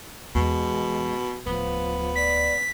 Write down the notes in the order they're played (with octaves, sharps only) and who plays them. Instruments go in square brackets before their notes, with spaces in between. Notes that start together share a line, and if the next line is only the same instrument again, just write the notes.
[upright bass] E2 [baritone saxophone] B2 [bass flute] G#3
[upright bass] D1 [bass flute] F3 [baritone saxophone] B3
[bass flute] D5 [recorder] B6